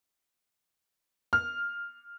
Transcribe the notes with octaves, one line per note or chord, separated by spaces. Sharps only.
F6